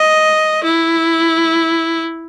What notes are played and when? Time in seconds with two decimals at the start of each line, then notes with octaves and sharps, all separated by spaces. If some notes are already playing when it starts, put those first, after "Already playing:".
Already playing: D#5
0.64 E4